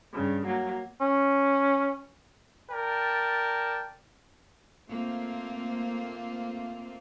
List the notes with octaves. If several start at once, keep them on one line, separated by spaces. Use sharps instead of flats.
G2 C#3
F#3 A#3
C#4
A#4 D5 G5 A5
A3 A#3 C4 F4